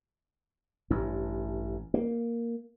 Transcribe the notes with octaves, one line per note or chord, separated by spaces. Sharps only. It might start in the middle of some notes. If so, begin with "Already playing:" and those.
A1 G2
A#3